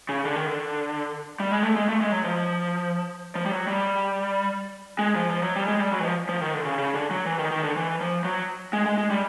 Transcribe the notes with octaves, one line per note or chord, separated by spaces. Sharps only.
C#3
D3
D#3
D3
G3
G#3
A3
G#3
A3
G#3
F#3
F3
F3
G3
F#3
G3
G#3
F3
F3
F#3
G3
G#3
G3
F#3
E3
F3
F3
D#3
D3
C#3
C#3
D3
F#3
E3
D#3
D#3
D3
E3
F3
F#3
G#3
G#3
G#3
G3